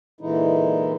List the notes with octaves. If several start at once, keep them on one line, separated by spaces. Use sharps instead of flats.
A#2 D3 E3 G#3 D#4 E4